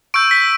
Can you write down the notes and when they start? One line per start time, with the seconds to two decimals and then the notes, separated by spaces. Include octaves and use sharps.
0.14 C#6 E6 G6 D7
0.31 B6